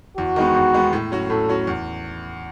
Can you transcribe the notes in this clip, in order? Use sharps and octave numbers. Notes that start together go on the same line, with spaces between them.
E2 F#4
D#3 G#3 B3
E2
D#3 G#3 B3
A2
F#3 C#4 F#4
A2 A4
F#3 C#4 F#4
E2